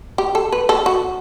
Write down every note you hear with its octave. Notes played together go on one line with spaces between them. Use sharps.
G4
A4
B4
A4
F#4